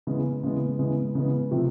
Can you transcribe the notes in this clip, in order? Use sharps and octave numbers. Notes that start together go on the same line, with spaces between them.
C#3 E3 G#3 B3
C#3 E3 G#3 B3
C#3 E3 G#3 B3
C#3 E3 G#3 B3
C3 F3 A3